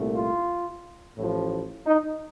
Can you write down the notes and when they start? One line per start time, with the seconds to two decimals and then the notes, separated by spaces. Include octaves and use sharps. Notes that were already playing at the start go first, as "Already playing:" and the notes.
Already playing: C2 A#2 A3
0.15 F4
1.17 A1 A2 F3
1.87 D#4